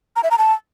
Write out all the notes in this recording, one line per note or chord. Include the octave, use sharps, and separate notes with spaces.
A#5
E5
A#5
A5